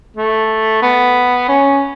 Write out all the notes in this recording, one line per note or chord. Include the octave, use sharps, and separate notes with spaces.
A3
B3
C#4